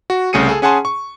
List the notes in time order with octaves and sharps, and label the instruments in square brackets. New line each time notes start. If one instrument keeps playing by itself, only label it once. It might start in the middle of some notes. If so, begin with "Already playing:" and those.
[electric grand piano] F#4
C2 C#3 A3 G#4 C#7 D#7
G#4 A4
C#4 G#4 F#5 G#5 A5 C6
C#6